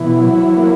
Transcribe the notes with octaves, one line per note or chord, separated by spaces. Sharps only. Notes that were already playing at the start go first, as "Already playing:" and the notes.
Already playing: B2 E3 E4
F#3
A#3